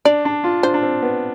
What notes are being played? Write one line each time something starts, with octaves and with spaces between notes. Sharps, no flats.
D4 D5
D4
F4
D4 C5
D4
C4
B3